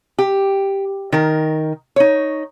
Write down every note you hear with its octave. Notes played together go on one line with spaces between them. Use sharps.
G4
D#3 A#4
D#4 C#5